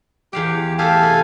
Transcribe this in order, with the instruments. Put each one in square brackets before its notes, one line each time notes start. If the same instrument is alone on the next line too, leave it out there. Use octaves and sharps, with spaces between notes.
[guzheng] E2 F5 G5 [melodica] G4
[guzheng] A3 G4 [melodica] A4 F5 G#5
[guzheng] C3